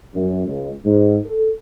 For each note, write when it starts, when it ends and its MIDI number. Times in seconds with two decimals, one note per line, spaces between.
0.14 0.47 42
0.47 0.70 37
0.84 1.17 44
1.25 1.47 69